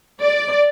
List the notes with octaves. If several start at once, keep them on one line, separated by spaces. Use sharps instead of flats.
D5